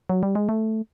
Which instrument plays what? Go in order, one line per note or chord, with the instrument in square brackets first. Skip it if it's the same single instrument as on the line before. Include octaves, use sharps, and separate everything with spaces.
[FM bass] F#3
G3
G#3
A3